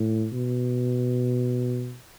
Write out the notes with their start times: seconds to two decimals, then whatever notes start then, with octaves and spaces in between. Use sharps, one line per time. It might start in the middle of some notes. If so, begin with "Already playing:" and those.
Already playing: A2
0.33 B2